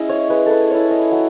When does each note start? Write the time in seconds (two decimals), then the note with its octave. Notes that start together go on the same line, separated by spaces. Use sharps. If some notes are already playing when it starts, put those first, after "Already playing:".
Already playing: G#3 C#4 E4 D#5
0.09 C#5
0.30 G#3 B4
0.46 A4 B4
0.71 C#4 E4 C#5
0.91 D#5
1.11 F#3